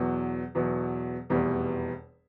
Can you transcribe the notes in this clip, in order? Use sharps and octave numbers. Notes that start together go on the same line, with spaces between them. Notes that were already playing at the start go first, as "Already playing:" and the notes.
Already playing: E2 B2 F#3
E2 B2 F#3
F1 E2 B2 G3